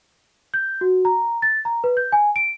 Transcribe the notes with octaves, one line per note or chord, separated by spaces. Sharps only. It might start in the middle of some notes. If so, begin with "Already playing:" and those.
G6
F#4
A#5
A6
A#5
B4
G6
G#5
D7